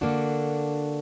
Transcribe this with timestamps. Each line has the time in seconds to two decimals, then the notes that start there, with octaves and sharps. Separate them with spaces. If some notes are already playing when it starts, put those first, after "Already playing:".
0.01 D3 A#3 D4 F#4